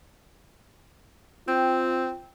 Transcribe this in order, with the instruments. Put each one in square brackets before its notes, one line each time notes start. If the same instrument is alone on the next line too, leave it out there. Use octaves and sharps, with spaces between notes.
[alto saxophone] C4 [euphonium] F4 [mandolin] G5